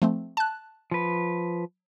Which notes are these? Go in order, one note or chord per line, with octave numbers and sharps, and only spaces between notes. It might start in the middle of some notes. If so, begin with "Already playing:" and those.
F3 A3 C4
A5 F#6
F3 B4